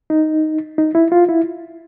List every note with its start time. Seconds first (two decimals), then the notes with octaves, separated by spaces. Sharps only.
0.10 D#4
0.78 D#4
0.95 E4
1.12 F4
1.29 E4